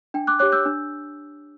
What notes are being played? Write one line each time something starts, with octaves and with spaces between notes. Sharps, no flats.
D4 G5
D6 F#6
G4 C#5 D6 F#6
E6 G6
D4